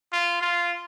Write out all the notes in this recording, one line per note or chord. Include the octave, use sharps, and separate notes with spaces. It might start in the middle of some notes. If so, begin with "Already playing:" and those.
F4
F4